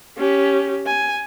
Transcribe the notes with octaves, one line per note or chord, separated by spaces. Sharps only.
C#4 G4
G#5